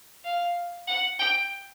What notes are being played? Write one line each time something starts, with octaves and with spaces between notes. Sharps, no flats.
F5
F#5
G5